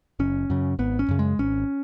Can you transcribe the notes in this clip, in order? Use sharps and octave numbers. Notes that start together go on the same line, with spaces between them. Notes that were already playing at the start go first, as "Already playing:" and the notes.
F#1 C#4
F#2 C#3
G#1 B3
C#4
F#2 C#3
G#3
G#1 C#4